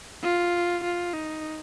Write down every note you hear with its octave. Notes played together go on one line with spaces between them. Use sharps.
F4
F4
D#4